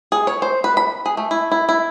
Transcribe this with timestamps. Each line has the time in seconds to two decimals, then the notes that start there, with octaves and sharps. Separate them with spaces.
0.12 G#4
0.27 C#5
0.42 C5
0.64 B4
0.77 B5
1.06 G#4
1.17 A3
1.31 E4
1.51 E4
1.69 E4